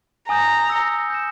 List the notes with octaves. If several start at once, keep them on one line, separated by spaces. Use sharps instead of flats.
G#5 A#5 D#6 G6
E6 A#6 C#7 G7
G6 A#6 E7